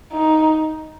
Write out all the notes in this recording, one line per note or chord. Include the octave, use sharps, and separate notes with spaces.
D#4